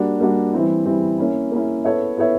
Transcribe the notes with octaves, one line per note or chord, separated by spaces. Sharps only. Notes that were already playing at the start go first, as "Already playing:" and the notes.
Already playing: G3 A#3 D4 F#4
G3 A#3 D4 F#4
E3 G3 C4 E4
E3 G3 C4 E4
A#3 C#4 E4
A#3 C#4 E4
B3 E4 A4 C#5 E5
B3 E4 A4 C#5 E5